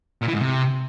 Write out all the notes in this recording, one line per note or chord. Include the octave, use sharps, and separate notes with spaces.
A#2
E3
G#2
C3